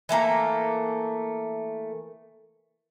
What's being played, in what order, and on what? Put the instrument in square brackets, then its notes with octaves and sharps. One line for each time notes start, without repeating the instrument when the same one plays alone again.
[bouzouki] E3 A3 A#3 A#5